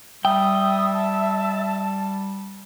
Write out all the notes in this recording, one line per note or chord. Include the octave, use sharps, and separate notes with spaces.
G3 E5 G5 D#6
A5